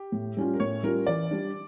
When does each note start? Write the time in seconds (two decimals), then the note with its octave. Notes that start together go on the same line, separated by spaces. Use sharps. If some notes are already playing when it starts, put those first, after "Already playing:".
Already playing: G4
0.12 A2
0.37 G3 C#4 F4
0.54 A#4
0.60 A2 C#5
0.83 G3 C#4 F4 A#4
1.07 E3 D5
1.31 G3 D4